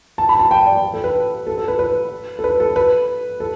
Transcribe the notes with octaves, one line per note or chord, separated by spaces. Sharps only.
A5
B5
A5
G5
D5
A4
B4
A4
A4
B4
B4
A4
B4
A4
B4
A4